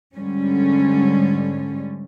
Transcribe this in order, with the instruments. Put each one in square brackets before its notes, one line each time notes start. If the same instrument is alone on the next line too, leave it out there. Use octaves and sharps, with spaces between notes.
[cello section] G#2 D3 G3 C#4